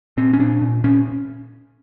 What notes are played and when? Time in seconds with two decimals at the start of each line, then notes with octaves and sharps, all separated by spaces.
0.17 A#2 C4
0.33 C#4
0.39 A#2 D4
0.61 A#2
0.84 A#2 C#4